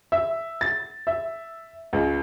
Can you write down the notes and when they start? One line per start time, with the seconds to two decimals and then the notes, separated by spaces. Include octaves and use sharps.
0.12 E5
0.61 A6
1.07 E5
1.93 C#2